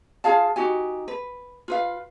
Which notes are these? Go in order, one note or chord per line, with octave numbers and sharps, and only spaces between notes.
F4 G#4 F5 A5
D#4 F#4 G4 G#5
B4
F4 B4 F5